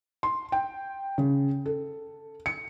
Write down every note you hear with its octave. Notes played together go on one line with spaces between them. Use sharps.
C6
G5
C#3
A4
C#7